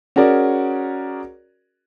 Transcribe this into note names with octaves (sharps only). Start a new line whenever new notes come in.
C#4 F#4 G#4 A#4 D5